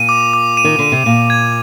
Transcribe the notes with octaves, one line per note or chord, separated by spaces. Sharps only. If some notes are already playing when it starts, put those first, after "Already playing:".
Already playing: A#2 D#7
D6
D6
D#7
D#3
D3 D#7
C3
A#2 D#7
G#6